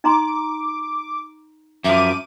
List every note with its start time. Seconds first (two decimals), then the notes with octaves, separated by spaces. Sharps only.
0.04 D#4 A#5 C6 D6
1.84 F#2 F3 E5 D6 D#7